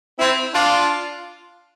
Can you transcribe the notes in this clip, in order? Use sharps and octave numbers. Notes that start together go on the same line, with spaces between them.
C4 E4
D4 F4